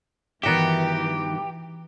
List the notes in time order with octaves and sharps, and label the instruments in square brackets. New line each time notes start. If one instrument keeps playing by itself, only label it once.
[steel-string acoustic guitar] G2 D#3 [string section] E3 [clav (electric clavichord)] B3 F#4 E5 [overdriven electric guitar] G4